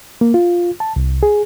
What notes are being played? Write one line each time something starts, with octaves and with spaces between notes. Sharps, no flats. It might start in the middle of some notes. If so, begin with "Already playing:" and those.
A#3
F4
A5
C2
G#4